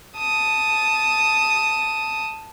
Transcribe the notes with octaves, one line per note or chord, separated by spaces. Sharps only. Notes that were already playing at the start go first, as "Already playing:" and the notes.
A5 D#6